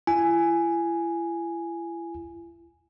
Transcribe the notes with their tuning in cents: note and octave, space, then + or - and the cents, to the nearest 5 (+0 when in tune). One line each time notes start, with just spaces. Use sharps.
E4 +40 G#5 +0